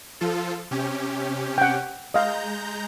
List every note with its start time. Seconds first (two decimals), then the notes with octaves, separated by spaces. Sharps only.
0.21 F3 F4 A4
0.71 C3 C#4 G4
1.58 F#5 G5
2.14 G#3 D#5 F5 A#5 G6